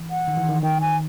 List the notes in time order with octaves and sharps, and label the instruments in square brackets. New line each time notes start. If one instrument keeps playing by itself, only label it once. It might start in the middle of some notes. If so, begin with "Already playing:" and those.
Already playing: [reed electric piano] E3
[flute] F#5
[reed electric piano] D#3
E3
D#3
[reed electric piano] D#3 [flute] G5
[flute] G#5